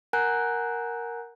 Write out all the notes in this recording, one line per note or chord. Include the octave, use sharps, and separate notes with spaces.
A#4 F#5 G#5 A#5 F#6 G6